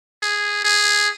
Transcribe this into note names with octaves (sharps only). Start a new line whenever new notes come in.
G#4
G#4